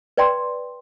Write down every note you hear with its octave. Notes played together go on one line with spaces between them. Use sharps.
B4 D5 G5 A#5 C6